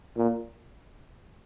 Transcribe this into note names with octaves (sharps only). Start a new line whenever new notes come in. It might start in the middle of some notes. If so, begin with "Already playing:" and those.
A#2